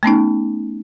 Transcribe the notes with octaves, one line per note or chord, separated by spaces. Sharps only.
A3 B3 C#4 D#4